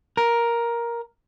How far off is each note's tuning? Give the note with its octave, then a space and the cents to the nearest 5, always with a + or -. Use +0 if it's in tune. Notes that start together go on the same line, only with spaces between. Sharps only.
A#4 +10